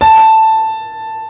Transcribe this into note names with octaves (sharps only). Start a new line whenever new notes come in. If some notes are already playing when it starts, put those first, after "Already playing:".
A5